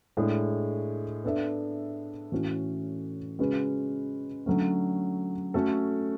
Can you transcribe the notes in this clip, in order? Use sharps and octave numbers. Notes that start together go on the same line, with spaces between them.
A2 G#3 D4 G#4
B3 D4 A4 E5
A2 E3 A3 C#4 F#4
C#3 G#3 C#4 F#4 B4
D3 F#3 A3 C#4
A3 C#4 F#4 A4